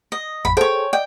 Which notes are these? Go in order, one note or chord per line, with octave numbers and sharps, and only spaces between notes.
D#5
A1 F2 B5
G#4 A4 C5 C#5 G5
D5 D#5 G5